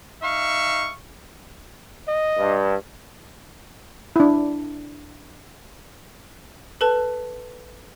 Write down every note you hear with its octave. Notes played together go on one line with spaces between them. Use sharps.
D#4 E5 F5 C#6
D#5
G2
D4 E4
A4 B4 A5